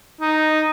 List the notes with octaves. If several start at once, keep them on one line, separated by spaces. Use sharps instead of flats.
D#4